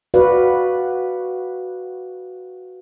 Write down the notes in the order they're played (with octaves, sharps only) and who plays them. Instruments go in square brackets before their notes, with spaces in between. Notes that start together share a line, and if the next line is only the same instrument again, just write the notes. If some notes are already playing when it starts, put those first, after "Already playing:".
[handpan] F#4 B4 D5 F5 F#5